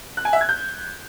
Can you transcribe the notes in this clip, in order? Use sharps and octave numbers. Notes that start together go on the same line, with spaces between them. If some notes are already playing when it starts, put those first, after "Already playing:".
F#6
G#5
E5
G#6
G6